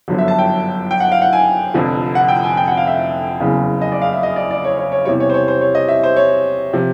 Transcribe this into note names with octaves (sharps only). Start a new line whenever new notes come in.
G1 F#2 D3 F3
E5
A5
G5
G5
F#5
F5
F#5
G#5
F1 F2 D3 F3
F#5
G5
G#5
G5
F#5
F5
E5
F#1 E2 C#3
D#5
D5
F5
E5
D#5
D5
D5
C#5
C#5
C#5
E2 C3 E3 G3 C#5
C#5
C5
C#5
C5
C#5
D#5
E5
C5
C#5
C3 F3